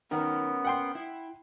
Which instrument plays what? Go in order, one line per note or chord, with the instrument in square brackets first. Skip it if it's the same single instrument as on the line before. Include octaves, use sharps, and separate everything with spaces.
[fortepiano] D#3 [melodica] B3 [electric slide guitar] C#4 A#4
[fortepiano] F#5 G5 C6
[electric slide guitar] E4